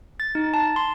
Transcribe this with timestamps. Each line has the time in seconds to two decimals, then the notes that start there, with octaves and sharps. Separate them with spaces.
0.20 A6
0.35 D#4
0.54 A5
0.76 C6